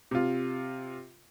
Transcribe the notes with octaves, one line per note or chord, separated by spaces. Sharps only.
C3 F4